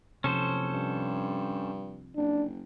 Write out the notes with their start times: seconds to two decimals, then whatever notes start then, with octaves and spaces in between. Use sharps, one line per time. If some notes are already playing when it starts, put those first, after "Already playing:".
0.24 F#1 C3 F3 C#4 A4 C5
0.73 G2
2.17 F#1 D4